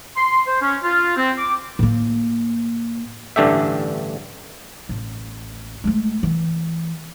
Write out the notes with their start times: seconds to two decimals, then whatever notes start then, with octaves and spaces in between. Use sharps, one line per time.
0.17 C6
0.48 C5
0.62 C#4
0.84 F4
1.17 C4
1.38 D6
1.79 A2 A#3
3.36 A1 G2 D3 A3 G4 E5
4.89 A1
5.84 G#3 A3
6.23 E3